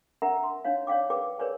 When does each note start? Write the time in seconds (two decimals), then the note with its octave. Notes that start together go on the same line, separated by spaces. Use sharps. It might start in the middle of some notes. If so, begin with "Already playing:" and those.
0.22 D4 A#4 E5 F#5 G#5 A#5
0.44 C6
0.65 D4 D#4 C#5 F5
0.87 C#5 D5 F5 G5 D6
1.10 G#4 A#4 B4 G5 D6
1.39 G#4 A#4 B4 C#5 D5 G#5